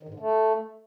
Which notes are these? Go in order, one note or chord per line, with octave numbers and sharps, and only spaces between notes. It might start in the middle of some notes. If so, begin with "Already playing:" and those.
D#3
G#2
D3
A3